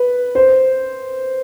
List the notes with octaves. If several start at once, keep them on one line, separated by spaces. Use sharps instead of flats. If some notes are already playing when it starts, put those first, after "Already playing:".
Already playing: B4
C5